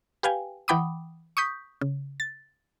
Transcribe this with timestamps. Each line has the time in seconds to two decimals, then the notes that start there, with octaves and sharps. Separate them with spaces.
0.23 G4 B4 F5 G5 G#5
0.68 E3 F#5 G5 B5 D6 D#6
1.37 C#6 D#6 G6 B6
1.81 C#3
2.20 A6